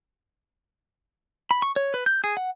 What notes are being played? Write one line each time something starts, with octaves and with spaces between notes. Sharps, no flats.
B5
C#6
C#5
B4
G6
G#4
F#5